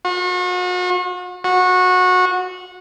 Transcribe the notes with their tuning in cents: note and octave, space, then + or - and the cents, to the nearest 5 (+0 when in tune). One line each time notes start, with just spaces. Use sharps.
F#4 -40
F#4 -20